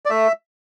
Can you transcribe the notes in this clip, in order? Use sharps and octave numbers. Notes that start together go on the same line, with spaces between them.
D5
A3 E5